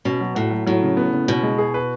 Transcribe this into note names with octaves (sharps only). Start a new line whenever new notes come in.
B2 C#4
F#3
A2 F#4
F#3
A2 F#3
C#3
B3
C#3
B2 C#4
G#3
G#4
B4